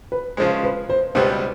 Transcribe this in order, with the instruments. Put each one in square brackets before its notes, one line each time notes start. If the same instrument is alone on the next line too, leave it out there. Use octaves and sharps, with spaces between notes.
[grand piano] B4
[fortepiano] C#3 F3 G#3 [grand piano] C5
[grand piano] B4
C5
[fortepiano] C#2 B2 G3 B3 [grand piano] C5